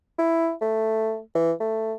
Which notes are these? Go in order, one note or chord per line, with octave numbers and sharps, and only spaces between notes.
E4
A3
E3
A3